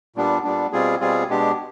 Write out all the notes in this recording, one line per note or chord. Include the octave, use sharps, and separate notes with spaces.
A#2 G3 B3 D4
A#2 G3 B3 D4
B2 G3 C4 F4 G#4
B2 G3 C4 F4 G#4
B2 G#3 B3 D4 G4